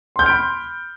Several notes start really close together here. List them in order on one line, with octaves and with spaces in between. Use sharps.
C6 G6 F6 D7 B5